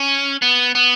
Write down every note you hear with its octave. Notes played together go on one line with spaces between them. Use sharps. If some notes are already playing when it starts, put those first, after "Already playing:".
Already playing: C#4
B3
B3